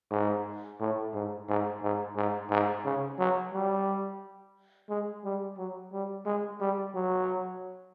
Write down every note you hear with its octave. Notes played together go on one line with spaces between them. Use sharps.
G#2
A2
G#2
G#2
G#2
G#2
G#2
C#3
F#3
G3
G#3
G3
F#3
G3
G#3
G3
F#3